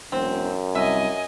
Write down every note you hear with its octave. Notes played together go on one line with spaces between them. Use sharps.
E1 F#2 C4
C2 D#5 E5 G#5